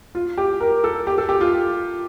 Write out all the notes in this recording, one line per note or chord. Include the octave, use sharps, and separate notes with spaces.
F4
G4
A#4
A4
G4
A4
G4
F4